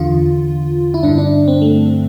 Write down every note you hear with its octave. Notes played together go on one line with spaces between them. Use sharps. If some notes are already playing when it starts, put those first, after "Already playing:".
Already playing: E2 D3 F4
E4
G2 D3 D4
D4
C4
A3